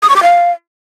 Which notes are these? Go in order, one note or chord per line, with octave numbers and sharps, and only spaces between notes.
D#6
C#6
D6
F5